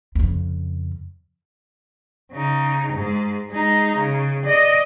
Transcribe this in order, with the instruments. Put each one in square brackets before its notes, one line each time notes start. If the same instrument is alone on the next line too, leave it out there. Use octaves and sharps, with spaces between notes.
[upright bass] F2 C#3
[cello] C#3 D#4
G#2 G#3
G#3 D#4
C#3
D5 D#5